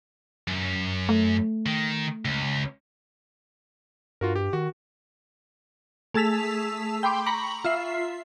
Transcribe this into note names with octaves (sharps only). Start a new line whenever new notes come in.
F#2
A3
D#3
C#2
G2 F4 F#4 A#4
G4
D#3 F#4
A3 G#4 A5 E6 B6 F7
G5 B5 C6 D6
A#5 B5 C#6 F#7
F4 E5 C7